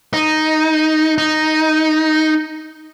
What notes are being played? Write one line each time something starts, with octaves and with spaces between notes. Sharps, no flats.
D#4
D#4